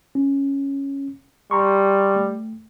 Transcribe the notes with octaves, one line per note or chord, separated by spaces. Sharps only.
C#4
G3 A#5 C6 C#6
A3